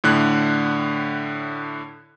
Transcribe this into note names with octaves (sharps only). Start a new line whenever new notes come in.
A2 D3 F#6